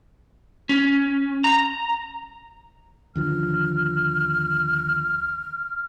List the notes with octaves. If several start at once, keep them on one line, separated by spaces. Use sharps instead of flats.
C#4
A#5
D#2 D3 F3 F6